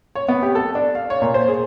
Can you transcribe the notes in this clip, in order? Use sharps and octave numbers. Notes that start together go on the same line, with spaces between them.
C#5
B3
G4
A4
D4
F5
C#5
A#2
C5
G#4